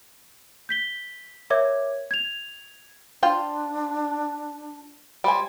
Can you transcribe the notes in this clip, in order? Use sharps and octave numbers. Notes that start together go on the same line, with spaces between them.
G6 B6 G7
A#4 C#5 E5 D6 G#6
G#6 F7
D4 F4 C5 G5
G3 C5 G#5